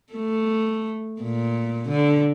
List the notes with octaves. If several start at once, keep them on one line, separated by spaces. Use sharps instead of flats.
A3
A#2
D3